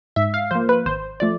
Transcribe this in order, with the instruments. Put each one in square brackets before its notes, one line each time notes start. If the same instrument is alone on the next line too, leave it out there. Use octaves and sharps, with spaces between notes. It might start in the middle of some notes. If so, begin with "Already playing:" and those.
[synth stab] G#2 E5
F5
F3 A#3 C5
B4
G#1 C5
F3 A3 D5